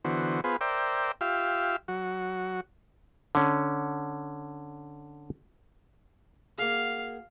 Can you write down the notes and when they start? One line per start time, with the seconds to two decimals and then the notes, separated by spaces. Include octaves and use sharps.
0.05 D3 E3 B3 F#4 C5
0.44 B3 F4 G#4 B4 C5
0.61 A#4 C5 D5 E5 G5
1.21 F4 G4 E5 F5
1.88 F#3 F#4
3.35 D3 C#4
6.58 A#3 F#4 G#4 F5